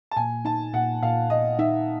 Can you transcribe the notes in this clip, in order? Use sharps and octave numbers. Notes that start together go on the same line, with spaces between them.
A5
A#2 G#5
D#4 A5
A#2 F#5
A#2 F5
A#2 D#5
D#4 E5